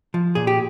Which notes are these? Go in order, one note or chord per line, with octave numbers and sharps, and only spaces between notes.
F3
A#2 G#4
G4